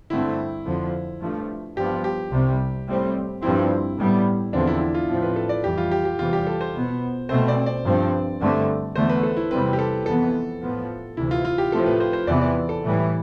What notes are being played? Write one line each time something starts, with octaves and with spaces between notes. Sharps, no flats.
G2 D3 A3 C4 E4
F2 D3 F3
G2 F3 A3
G2 F3 B3 G4
G4
C2 C3 G3
A2 G3 C4
G2 F3 C4 E4
A2 G3 B3
E2 D3 F3 C4 D4
E4
E4
F4
A2 F3 C4
B4
A4
D5
F2 E3 G3 G4
F4
G4
G4
E2 C3 E3 G3 F4
G4
A4
C5
B2 B3
B2 A3 C4 C5
D5
D5
G2 F3 C4
G2 D3 A3 C4
E2 D3 A3 C5
B4
A4
E4
E2 C3 G3 C4 B4
G4
A4
F2 E3 B3 A4
A2 F3 B3
D2 C3 E3 E4
F4
F4
G4
A2 F3 A3 C4 A4
B4
C5
C5
E2 C3 E3 B3 D5
D5
A4
A2 E3 G3